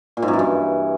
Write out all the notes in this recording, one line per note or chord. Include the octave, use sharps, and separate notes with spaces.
A#2
G#2
F#2
E3
G2